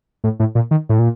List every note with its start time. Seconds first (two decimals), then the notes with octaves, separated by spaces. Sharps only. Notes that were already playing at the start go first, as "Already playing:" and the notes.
0.24 A2
0.40 A2
0.55 A#2
0.71 D#3
0.89 A2
0.99 A#2